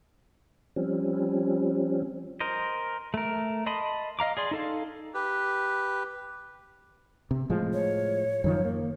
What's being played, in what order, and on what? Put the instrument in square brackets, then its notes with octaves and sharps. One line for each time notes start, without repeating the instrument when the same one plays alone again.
[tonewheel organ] F3 G3 C4 C#4
[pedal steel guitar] A#4 C5 D#5
A3 A#4
D#5 A5 B5 C6 D#6
D#5 F5 A#5 D6
G#4 D5 C6
D#4 A4 F5
[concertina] G4 B4
[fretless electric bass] C3
A2 F3 G#3
[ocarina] C#5
[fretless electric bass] F#2 D#3 F3
A#3